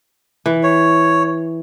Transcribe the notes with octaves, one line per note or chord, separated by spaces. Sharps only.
E3
C#5